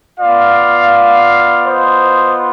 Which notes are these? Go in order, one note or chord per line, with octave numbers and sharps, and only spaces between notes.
B3 F4 D5 F5
C5 D#5